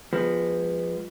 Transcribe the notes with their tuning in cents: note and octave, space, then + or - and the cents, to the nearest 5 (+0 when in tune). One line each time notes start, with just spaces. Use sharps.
F3 +0 G#3 -20 B3 +0